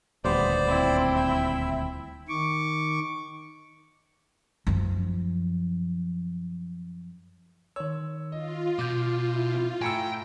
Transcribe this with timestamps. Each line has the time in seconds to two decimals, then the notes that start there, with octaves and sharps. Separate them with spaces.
0.24 D#1 D2 G3 B3 C5 D5
0.66 C4 E4
1.16 E5
2.29 D#3 C#6 D6
4.67 F#2 F3
7.76 D#3 C#5 E6
8.32 F4 D#5
8.79 B2 D6 G6
9.36 E4
9.82 A2 G5 G#5 A#5 E6 C#7